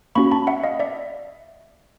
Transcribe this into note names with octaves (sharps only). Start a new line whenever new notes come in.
A#3 C#4 F#4 B5 C#6
A5 B5
E5 F#5
D#5 F5
D5 E5